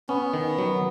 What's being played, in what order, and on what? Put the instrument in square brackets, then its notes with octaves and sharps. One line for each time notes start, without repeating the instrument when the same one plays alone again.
[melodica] B3 [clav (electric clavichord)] C#4
[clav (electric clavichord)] D#3
F#3